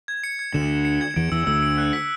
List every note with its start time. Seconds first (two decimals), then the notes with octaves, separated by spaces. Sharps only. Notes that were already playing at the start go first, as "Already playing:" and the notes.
0.08 G#6
0.24 C#7
0.39 G#6
0.54 D2 D3 E7
0.70 E7
0.85 C#7
1.01 G#6
1.16 E2 E3 D7
1.31 E2 E3 E6
1.47 D2 D3 E6
1.62 D7
1.78 F#6
1.93 B6